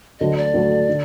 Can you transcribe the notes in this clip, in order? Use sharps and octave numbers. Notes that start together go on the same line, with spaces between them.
D2 D3 F#3 A3 D#5
D5
D2 D3 F#3 A3
D3